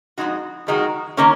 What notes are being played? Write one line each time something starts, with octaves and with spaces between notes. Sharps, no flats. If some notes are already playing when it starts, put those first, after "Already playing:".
F2 D#3 G#3 D#4 F#4
F2 D#3 G#3 D#4 F#4
D#3 A#3 C#4